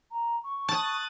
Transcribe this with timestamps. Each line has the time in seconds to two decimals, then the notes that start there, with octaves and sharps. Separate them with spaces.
0.11 A#5
0.44 C#6
0.69 A5 D#6 F#6 A6